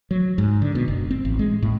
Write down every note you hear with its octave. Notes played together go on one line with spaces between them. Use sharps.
F#3
G#2
D3
B2
F#1
C4
A1
G#3
A2